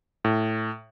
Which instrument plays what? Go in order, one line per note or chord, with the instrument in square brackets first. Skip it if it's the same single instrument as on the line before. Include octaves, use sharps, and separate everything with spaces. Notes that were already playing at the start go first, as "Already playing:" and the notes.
[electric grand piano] A2